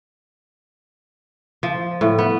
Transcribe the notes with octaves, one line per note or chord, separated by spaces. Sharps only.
F3
A2
B3